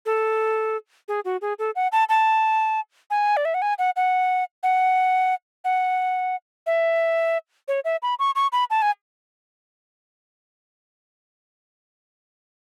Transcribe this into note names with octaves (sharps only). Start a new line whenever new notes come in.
A4
G#4
F#4
G#4
A4
F#5
A5
A5
G#5
D5
E5
F#5
G#5
F#5
F#5
F#5
F#5
E5
C#5
E5
B5
C#6
C#6
B5
A5
G#5